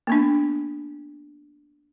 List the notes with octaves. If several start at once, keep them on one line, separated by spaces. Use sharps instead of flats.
A#3 B3 D4